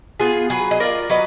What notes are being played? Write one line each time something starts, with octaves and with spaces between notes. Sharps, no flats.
B3 F4 G#4
F#3 G#4 B4
D#5
F4 A#4 D5
F#3 B4 D#5